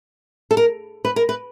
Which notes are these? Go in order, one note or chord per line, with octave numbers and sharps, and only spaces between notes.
A4
A#4
B4
A#4
B4